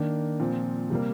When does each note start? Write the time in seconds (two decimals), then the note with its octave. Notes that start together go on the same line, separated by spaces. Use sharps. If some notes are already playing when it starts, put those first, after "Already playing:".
Already playing: D#3 A#3 D4
0.40 A#2 F3 C4
0.90 C3 G3 A#3